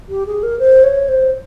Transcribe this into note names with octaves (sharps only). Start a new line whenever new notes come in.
G4
G#4
A#4
C5
C#5
C5